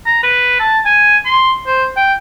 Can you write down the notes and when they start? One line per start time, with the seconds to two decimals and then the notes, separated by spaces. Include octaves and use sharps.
0.06 A#5
0.23 B4
0.60 A5
0.85 G#5
1.25 C6
1.66 C5
1.96 G5